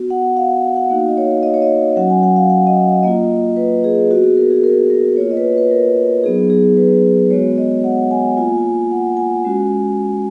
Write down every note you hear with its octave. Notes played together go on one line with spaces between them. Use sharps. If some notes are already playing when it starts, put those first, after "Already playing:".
Already playing: B3 F#4
F#5
F5
F#5
F#5
A#3 D#4 F#4 F5
D#5
C#5
D#5
C#5
D#5
F5
F#3 C#4 F#4 F#5
G#5
F#5
F5
F#5
D#5
F5
A#3 F4 D#5
B4
G#4
F#4
B3
G#4
A#4
G#4
A#4
A#4
A#3 F4 C#5
D#5
B4
C#5
B4
A#4
F#3 B3 D#4 G#4
G#4
B4
G#3 B3 F#4 C#5
D#5
F#5
G#5
A#3 F4 G#5
G#5
F#5
G#5
G#3 C#4 F#4